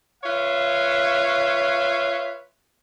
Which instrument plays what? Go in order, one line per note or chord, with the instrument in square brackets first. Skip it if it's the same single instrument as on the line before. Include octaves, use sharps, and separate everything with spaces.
[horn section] F4 B4 C#5 E5 F5